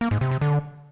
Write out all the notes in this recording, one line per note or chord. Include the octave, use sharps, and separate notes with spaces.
A#3
G#2
C3
C3
D3